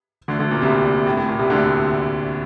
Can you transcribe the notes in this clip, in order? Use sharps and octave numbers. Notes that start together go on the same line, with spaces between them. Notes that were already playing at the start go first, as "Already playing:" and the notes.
D2 D3
D2 D3
A#2
C2 C3
A2
A2
A#2
C2 C3
D2 D3